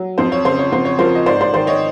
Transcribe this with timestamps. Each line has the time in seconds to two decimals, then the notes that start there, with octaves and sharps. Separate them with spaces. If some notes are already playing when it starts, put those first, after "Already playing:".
Already playing: F#3
0.18 F2 C5
0.32 C#5
0.45 C#3 C5
0.59 C#5
0.72 F2 C5
0.85 C#5
0.99 F3 A#4 C5
1.15 D#5
1.26 G#2 C5 D5
1.41 C5 D5
1.54 D#3 C5 D5
1.67 C#5 D#5